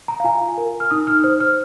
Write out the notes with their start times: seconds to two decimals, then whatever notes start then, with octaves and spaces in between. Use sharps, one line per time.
0.08 A#5
0.20 F5
0.24 F4 G#5
0.57 A#4
0.80 F6
0.91 D#4 D#6
1.07 F6
1.24 C5 F6
1.40 F6